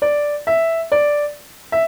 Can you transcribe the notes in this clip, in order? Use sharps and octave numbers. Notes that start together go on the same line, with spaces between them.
D5
E5
D5
E5